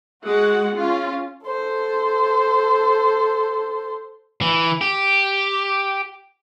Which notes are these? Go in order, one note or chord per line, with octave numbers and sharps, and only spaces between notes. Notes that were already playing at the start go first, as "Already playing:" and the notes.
G#3 F#4 F#5
C#4 F4
A4 C5
E3
G4